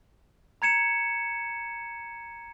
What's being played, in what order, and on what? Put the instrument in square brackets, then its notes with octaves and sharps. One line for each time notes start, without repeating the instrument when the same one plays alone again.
[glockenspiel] A#5 G#6 C#7 E7